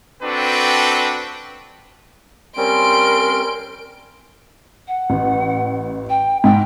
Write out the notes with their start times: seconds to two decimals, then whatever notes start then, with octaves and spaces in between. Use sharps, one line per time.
0.23 C4 D4 F#4 A4 B4 G5
2.57 G3 C4 C#4 A#4 C6 D7
4.87 F#5
5.10 A1
6.09 G5
6.44 G#2 G5